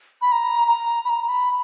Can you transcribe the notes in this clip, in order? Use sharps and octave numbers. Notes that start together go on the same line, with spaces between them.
B5
A#5
A#5
B5
A#5
B5